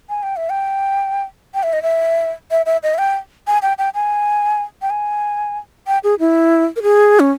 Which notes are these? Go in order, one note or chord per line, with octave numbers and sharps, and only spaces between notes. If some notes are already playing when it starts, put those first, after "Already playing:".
G#5
G5
E5
G5
G5
E5
D#5
E5
E5
E5
D#5
E5
G5
G#5
G5
G5
G#5
G5
G#5
G5
G#4
E4
A#4
G#4
C#4